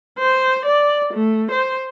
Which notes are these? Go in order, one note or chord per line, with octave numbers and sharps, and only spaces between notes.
C5
D5
A3
C5